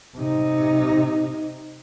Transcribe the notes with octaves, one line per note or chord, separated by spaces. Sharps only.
C3 D#4